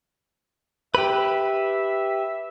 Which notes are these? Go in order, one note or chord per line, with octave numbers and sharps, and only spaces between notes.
G4 B4 E5